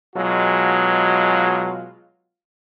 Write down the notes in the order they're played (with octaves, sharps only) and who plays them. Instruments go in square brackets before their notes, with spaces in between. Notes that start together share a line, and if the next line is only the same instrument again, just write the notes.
[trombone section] B2 F#3 G#3 F4